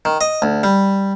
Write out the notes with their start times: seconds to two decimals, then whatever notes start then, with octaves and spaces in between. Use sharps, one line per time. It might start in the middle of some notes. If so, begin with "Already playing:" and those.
0.05 D#3
0.21 D#5
0.42 D2
0.63 G3